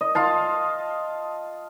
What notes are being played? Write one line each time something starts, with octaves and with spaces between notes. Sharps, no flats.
D#5
F4 F5 A5